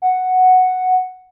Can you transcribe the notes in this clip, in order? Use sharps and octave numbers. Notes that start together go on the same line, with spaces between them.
F#5